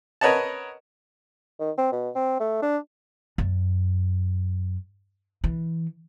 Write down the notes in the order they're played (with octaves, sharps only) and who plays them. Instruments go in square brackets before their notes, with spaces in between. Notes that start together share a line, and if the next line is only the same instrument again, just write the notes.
[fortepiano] A#4 B4 C#5 D#5 F#5 A5
[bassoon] D#3
C4
B2
C4
A3
D4
[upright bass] F#2
E3